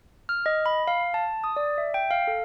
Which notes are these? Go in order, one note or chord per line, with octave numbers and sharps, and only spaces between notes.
F6
D#5
B5
F5
A5
D#6
D5
E5
G5
F5
A4